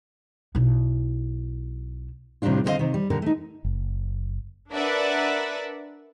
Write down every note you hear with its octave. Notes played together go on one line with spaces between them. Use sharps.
B1 E4
A2 C3 D#3 G3 D4 F4
A2 D3 C4 G#4 D#5 F5
C3 D#3
G3
A#2 D3 G4 A#4
A3 D#4
F#1
D4 A#4 B4 D5 E5 F#5